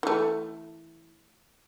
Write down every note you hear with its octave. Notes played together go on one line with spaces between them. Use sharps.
E3 A3